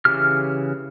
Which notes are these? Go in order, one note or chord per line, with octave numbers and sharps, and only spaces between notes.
C#3 E3 G4 F6